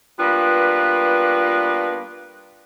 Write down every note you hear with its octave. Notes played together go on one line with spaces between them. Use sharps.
G3 A#3 B3 D4 F4 B4